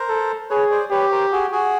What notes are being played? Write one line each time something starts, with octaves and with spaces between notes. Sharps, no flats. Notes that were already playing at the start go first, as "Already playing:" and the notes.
Already playing: A#4 C5
A4
G#4 B4 C#5
C5 D5
G4 B4 C#5
A#4 C5
F#4 G#4
F#4 G#4